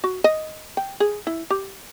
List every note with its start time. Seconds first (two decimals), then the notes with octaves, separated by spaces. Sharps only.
0.04 F#4
0.24 D#5
0.77 G5
1.00 G#4
1.27 E4
1.50 G4